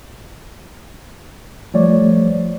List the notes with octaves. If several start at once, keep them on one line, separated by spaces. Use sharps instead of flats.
F3 G3 A3 C#5 D5